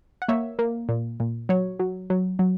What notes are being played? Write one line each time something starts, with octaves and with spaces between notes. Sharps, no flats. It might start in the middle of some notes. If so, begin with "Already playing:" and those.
F#5
A#3 C#5 E5
A#3
A#2
A#2
F#3 C#5
F#3
F#3
F#3